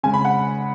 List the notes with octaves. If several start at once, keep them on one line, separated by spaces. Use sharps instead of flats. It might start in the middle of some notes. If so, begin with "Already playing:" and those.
C#3 G#3 G#5
B5
F#5